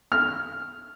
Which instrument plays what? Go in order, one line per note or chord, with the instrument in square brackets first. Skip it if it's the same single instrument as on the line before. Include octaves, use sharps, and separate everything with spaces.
[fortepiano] F6